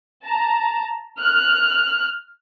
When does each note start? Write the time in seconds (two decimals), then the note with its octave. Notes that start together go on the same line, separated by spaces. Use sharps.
0.24 A5 A#5
1.19 F6 F#6